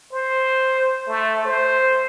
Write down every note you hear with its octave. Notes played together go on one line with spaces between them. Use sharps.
C5
A3
C5